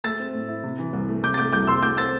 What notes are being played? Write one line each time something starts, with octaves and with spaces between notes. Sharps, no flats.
A3 E6 A6
C4
A2
E4
C3
E3
C2
A3
C3 D6 G6
A6
A3 D6 G6
C2 D6 G6
C2 C6 E6
A3 D6 G6
C4 E6 A6